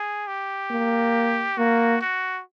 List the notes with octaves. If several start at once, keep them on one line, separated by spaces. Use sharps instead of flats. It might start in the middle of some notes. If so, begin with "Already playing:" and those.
Already playing: G#4
G4
A#3
A#3 F#4
F#4